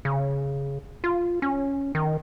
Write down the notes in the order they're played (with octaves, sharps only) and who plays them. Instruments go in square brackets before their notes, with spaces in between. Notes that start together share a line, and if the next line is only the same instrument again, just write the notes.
[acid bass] C#3
F4
C#4
D#3